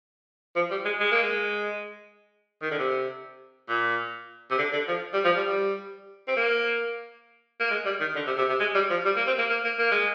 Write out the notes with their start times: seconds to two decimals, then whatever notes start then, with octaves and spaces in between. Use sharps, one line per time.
0.56 F3
0.71 G3
0.85 G#3
1.00 G#3
1.12 A#3
1.22 G#3
2.62 D#3
2.71 D3
2.79 C3
3.69 A#2
4.51 C3
4.58 D3
4.73 D3
4.88 F3
5.14 G3
5.25 F3
5.36 G3
5.47 G3
6.28 C4
6.37 A#3
7.60 A#3
7.71 G#3
7.85 G3
8.00 D#3
8.16 D3
8.27 C3
8.38 C3
8.49 C3
8.60 G#3
8.75 G3
8.90 F3
9.05 G3
9.16 A#3
9.27 C4
9.38 A#3
9.50 A#3
9.64 A#3
9.79 A#3
9.92 G#3